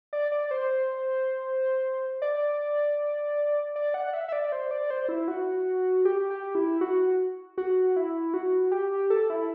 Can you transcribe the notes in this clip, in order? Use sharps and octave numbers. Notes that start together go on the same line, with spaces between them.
D5
D5
C5
D5
D5
F#5
E5
E5
D5
C5
D5
C5
E4
F#4
G4
G4
E4
F#4
F#4
E4
F#4
G4
A4
E4